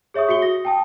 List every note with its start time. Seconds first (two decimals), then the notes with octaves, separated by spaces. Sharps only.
0.14 G#4 C#5 E5 C#6 D#6
0.29 F#4 E5 C#7 G7
0.42 D#6 A#6
0.65 G5 A5 D#6